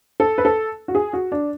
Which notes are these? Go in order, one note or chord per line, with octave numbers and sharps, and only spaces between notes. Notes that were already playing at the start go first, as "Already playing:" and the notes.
A4
B4
A4
F#4
G#4
F#4
D4